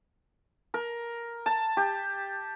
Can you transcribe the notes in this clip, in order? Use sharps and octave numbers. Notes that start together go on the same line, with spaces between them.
A#4
A5
G4